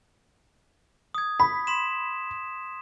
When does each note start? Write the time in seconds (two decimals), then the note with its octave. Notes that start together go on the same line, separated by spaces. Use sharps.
1.14 D#6 G#6
1.40 B5 B6
1.67 C6 B6 E7